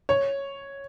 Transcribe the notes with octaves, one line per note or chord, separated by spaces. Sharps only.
C#5